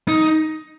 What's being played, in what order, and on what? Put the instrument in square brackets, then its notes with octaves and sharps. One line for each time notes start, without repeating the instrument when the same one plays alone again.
[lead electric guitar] D#4